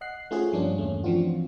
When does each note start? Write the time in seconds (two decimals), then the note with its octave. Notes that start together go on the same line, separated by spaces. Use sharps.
0.01 D#5 F#5 F#6 C7
0.31 A3 C#4 F4 F#4 G#4 C5
0.52 G2 F3 G3 A#3 C#4 D4
0.78 E2 G2 A3 C#4
1.03 E3 F3 C4 D4 F4 F#4